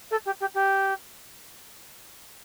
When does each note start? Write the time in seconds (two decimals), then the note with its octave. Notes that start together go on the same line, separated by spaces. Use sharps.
0.11 A4
0.26 G4
0.41 G4
0.55 G4